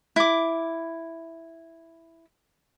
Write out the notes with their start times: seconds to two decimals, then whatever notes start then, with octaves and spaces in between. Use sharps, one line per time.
0.16 E4 D6